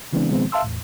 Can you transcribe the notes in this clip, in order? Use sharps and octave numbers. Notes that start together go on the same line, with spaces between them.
C#3 E3 G#3 B3 C4 D4
B2 D#3 F3 G#3 B3 C4
E5 F5 A5 C6 E6
E2 A2